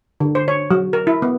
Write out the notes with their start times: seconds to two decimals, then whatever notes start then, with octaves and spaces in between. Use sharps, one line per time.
0.20 D3
0.35 C5
0.48 C#5
0.71 F#3
0.93 A#4
1.07 E4
1.22 B3